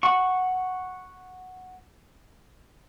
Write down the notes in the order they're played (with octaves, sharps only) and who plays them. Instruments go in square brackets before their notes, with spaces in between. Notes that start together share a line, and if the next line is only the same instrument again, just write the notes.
[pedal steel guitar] F#5 C#6